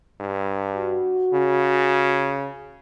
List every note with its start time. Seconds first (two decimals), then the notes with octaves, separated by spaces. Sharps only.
0.20 G2
0.75 F#4
1.33 C#3